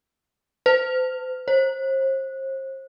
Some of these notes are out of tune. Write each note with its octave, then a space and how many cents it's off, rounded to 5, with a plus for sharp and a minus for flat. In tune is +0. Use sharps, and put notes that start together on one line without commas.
C5 -40
C5 +35